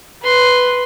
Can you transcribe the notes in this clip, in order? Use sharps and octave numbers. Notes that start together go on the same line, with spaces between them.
B4 C6